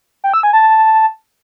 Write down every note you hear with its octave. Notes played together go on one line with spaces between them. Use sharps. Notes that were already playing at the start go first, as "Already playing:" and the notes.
G5
E6
G#5
A5